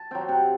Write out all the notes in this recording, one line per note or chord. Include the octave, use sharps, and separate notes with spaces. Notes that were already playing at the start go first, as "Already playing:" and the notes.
Already playing: A5
F#3 C4 G5
C3 F#5